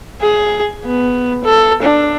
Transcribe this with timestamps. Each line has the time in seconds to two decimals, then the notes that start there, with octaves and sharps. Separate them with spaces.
0.22 G#4
0.85 B3
1.45 A4
1.82 D4